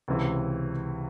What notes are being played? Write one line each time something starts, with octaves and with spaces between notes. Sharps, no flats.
C#2 C3 E3 C4